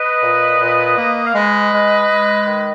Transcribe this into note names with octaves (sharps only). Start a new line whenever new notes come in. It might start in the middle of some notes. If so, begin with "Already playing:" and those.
Already playing: B4 D#5
A#2
A#2
A#3
F5
G#3 B4 D#5
G#3
G#3
D#3